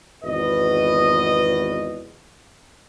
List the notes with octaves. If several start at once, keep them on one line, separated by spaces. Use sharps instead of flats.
G#1 E2 B2 B4 D#5